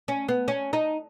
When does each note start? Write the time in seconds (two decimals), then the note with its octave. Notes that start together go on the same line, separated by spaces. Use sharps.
0.08 C#4
0.28 B3
0.48 C#4
0.73 D#4